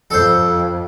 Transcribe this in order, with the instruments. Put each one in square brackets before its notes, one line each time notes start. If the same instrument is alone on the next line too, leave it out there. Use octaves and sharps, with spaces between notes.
[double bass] F2 [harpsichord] A4 C5